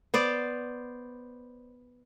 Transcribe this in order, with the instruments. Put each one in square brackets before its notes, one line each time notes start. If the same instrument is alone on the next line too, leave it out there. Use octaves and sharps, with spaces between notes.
[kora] B3 C5 D5